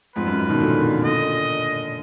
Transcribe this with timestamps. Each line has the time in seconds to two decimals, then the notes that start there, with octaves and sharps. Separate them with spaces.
0.16 F2 G#2 B4
0.26 F#2
0.38 F#2
0.49 B2 D#3
0.60 A#2 D3
1.04 A#2 D3 D#5